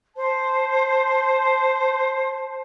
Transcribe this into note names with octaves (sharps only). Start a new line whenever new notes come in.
C5 A5